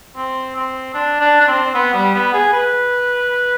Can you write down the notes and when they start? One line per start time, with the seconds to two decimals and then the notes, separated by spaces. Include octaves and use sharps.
0.16 C4
0.56 C4
0.94 D4
1.21 D4
1.41 D4
1.48 C4
1.75 B3
1.94 G3
2.14 B3
2.34 G#4
2.53 B4